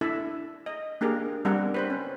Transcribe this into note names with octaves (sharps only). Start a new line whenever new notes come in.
D4 E4 A4 E5 A5
D#5
A#3 D4 G4 G#4 A#4
G3 B3 C4 D4 A#4 F#5
B4 C5 B5
C#4